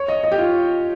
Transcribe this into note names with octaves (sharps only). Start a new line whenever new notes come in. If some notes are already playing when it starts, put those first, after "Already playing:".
Already playing: C#5
D#5
D#5
G4
F4